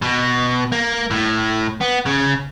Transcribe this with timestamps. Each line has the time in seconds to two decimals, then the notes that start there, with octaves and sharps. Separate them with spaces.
0.02 B2
0.72 A#3
1.11 A2
1.81 B3
2.06 C#3